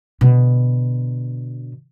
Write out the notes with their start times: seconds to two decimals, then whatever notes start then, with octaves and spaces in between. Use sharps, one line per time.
0.21 B2 D3